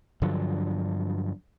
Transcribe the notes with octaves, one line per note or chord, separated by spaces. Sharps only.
G2 D3 F3 F#3